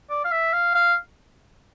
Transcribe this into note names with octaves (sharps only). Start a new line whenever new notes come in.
D5
F5
E5
F5
F5